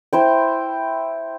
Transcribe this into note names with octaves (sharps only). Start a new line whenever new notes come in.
E4 C5 G5